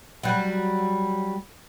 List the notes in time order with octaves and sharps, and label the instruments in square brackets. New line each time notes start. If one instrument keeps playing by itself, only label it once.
[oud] F#3 G3